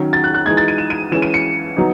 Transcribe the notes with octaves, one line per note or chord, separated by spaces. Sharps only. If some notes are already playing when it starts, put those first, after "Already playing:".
Already playing: D#3 F#3 C#4
A6
F#6
F#6
E3 G#3 D#4 G#6
A6
D#7
E7
D#7
E3 G#3 C#4 E7
D#7
C#7
F#3 B3 D#4